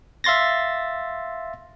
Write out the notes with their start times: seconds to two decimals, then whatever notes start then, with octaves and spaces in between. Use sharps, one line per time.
0.24 E5 F5 C6 A6 A#6